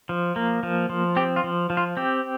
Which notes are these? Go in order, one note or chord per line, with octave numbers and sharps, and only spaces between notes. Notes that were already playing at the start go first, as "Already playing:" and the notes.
F3
A#3
F3
F3
C4 G4
F4
F3
F3
F4
C4 G4